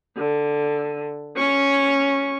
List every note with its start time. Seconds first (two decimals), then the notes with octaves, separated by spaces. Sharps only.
0.17 D3
1.36 C#4 C#6